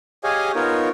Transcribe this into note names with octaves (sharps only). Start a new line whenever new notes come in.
G4 G#4 C#5 D#5 F5 G#5
B3 D#4 F4 A#4 C#5